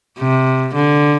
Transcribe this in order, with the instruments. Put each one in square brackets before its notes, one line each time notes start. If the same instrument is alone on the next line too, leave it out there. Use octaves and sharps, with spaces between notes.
[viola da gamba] C3
D3